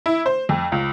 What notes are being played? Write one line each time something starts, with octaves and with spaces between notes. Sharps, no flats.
E4
C5
F2
C#2